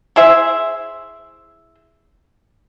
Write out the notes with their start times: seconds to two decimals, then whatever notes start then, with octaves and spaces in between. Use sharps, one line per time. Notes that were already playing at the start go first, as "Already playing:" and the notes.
0.16 E4 G#4 C5 E5